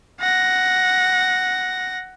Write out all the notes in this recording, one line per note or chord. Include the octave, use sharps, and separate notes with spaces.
F#5 A#6